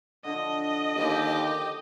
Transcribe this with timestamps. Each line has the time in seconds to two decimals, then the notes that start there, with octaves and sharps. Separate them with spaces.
0.24 D3 F3 D#5
0.96 D#2 G4